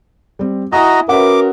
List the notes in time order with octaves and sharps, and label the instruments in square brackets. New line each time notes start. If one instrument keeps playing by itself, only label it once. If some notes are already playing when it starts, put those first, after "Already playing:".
[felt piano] G3 C4
[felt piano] E4 G#5 D#6 [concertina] F#4 D#5 A#5
[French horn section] C#4 F#4 A#4 [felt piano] B4 E5 F#5 [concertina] D6